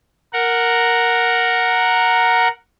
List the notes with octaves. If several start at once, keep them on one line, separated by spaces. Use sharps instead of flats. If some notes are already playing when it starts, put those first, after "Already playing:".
A#4 F#5